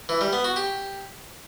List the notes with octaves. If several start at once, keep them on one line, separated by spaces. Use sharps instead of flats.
E3
G3
B3
F#4
G4